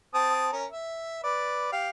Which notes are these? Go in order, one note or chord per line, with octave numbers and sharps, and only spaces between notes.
C4 A5 D#6
C#4 A#4
E5
B4 D5
G4 F5